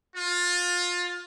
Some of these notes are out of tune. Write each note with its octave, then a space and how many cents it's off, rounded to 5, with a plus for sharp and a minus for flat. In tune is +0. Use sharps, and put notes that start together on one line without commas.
F4 +20